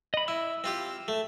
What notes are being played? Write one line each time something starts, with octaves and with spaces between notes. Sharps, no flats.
D#5 B5
E4 E6
C4 F4 G4
A3